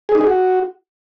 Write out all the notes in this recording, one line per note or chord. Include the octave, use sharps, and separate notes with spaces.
G#4
D#4
G#4
F#4